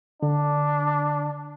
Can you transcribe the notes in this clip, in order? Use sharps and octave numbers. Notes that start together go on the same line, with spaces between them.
D3 D4